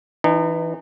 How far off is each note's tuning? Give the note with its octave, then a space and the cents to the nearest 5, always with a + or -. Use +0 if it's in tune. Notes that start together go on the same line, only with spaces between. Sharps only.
E3 +0 D#4 -35